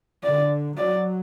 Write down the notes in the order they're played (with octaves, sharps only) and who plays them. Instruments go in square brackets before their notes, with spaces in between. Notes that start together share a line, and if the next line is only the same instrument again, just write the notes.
[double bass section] D3 [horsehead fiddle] D5
[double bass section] F#3 [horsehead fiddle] D5